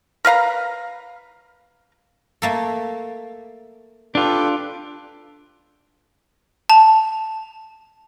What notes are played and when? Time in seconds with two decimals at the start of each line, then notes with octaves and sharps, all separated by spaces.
0.25 A#4 B4 F5 A#5
2.42 A3 A#3 A4
4.15 D4 F4 G4 A4 B4
6.70 A5 F7